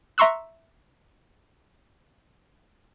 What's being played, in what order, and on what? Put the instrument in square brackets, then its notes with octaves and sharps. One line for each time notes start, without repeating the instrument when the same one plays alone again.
[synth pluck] E5 A#5 C6 C#6 E6 F#6